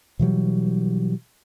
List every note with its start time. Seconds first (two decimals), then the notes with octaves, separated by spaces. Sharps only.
0.19 B2 E3 F#3 G3